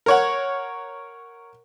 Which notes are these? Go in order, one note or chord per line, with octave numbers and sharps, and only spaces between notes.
A#4 C#5 F#5